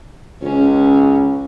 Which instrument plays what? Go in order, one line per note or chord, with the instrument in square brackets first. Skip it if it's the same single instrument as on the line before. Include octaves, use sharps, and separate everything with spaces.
[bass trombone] C#2 [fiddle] C#4